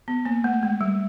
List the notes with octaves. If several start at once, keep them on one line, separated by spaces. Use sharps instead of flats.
B3
A#3
A3
G#3
G3